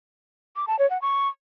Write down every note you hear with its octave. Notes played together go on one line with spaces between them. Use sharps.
D6
A5
C#5
F#5
C#6